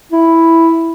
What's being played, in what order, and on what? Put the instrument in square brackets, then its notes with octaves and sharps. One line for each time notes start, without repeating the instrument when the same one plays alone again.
[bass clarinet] E4